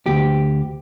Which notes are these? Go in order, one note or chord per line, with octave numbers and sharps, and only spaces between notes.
D2 G4